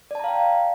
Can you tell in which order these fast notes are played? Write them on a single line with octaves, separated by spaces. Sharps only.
D5 A5 A#5 F5 G5